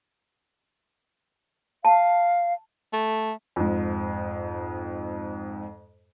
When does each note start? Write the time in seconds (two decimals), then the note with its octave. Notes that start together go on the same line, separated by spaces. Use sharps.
1.85 F5 A5
2.93 A3
3.56 F2 G#2